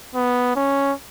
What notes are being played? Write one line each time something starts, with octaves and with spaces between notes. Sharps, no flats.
B3
C#4